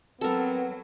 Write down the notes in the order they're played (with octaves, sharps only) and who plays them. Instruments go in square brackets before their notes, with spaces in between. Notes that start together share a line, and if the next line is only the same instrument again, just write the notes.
[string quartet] F#3 [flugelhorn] B3 [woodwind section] C4 [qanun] A4 A#4